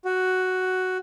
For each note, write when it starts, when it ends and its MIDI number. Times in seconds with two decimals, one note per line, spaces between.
0.05 0.97 66